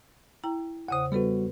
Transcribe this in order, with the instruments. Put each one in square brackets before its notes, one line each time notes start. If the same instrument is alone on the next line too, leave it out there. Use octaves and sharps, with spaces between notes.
[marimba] E4 G5 A#5
[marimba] E2 C#3 C5 [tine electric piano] F#5 D#6
[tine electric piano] G3 F#4 [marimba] B3 A4 B4